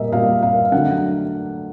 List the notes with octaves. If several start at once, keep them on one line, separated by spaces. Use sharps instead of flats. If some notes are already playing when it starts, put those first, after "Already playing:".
Already playing: A#2 G3 A#3 D#5 E5
A#2 G3 A#3 F5
F5
D3 F#3 A3 F#5